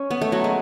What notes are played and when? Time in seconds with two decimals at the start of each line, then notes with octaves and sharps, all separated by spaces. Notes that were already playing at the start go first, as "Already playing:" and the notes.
Already playing: C#4
0.11 B3
0.21 A3
0.32 F#3
0.44 G#3